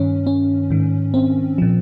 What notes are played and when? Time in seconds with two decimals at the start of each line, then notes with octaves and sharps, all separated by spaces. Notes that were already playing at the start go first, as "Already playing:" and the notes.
Already playing: G2 D#3 C#4
0.27 C#4
0.70 G#2 D#3
1.14 C4
1.58 A#2 F3